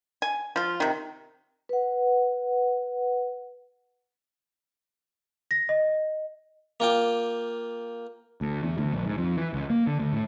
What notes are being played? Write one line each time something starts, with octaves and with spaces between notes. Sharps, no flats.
G#5
F3 F4
C3 D#3
B4 F#5
A#6
D#5
A#3 F4 G5 D6
D2
E2
D2
A#1
G#2
F2
E3
C#2
A#3
D3
D2
A2